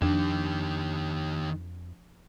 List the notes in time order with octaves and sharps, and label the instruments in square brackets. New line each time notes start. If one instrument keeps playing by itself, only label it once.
[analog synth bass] F2 [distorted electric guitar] D#3 G4 [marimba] F3 D4